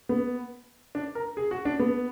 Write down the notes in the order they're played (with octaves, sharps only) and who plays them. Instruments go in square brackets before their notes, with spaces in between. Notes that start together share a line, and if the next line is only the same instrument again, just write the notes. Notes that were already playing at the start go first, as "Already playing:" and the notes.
[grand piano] B3
D4
A#4
G#4
F#4
D4
B3